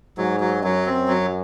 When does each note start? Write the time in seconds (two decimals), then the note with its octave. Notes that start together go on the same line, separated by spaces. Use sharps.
0.17 G#2 F#3
0.40 F#3
0.63 F#2 F#3
0.86 C4
1.08 F#3